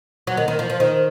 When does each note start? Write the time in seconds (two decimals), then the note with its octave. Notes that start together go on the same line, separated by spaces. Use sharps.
0.27 F#3
0.37 D#3
0.48 D#3
0.59 F3
0.70 F3
0.80 D#3